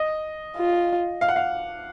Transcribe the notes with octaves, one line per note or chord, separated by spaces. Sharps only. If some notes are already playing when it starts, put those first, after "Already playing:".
Already playing: D#5
F4
F5
F#5
F5